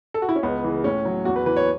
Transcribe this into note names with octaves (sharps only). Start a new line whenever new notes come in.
A4
F#4
E4
C#4
C#2 B3
C#3 E3
A2 C#4
F#3
E2 F#4
B4
E3 B4
C#5